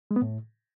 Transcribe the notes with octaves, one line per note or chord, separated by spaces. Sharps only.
G#3
B3
A2